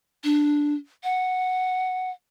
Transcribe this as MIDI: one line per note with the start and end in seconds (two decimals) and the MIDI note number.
0.24 0.74 62
1.04 2.10 78